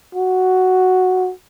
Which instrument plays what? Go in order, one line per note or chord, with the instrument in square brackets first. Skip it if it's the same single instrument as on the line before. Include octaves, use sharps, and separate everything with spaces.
[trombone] F#4